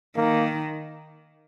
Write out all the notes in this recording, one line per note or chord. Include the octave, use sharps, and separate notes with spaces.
D#3 A#3